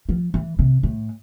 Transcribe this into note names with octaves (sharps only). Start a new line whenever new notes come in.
F3
E3
C3
A2